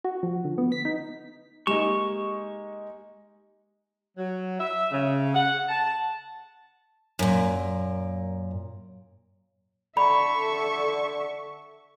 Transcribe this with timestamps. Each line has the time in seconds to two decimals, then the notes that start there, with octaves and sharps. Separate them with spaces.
0.04 F#4
0.23 F3
0.45 D3
0.58 B3
0.72 B6
0.85 D#4
1.67 G#3 A#3 D#4 G4 C#6 E7
4.17 F#3
4.59 E5
4.91 C#3
5.34 F#5
5.69 A5
7.19 F#2 A#2
9.97 D3 A4 E5 B5 C#6